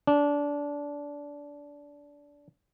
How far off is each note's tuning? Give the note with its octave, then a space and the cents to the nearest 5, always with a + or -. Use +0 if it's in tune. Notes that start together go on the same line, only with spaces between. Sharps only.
D4 -20